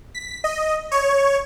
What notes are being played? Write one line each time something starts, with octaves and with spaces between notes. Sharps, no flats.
B6
D#5
C#5